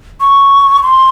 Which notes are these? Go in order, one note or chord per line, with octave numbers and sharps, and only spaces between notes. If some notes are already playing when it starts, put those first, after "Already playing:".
C#6
C6